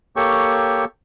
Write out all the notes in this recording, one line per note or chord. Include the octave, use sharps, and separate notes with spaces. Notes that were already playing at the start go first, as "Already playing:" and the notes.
A#3 G4 A4 C#5 G5 C#6